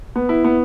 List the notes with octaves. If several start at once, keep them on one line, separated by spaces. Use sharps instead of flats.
B3
E4
B3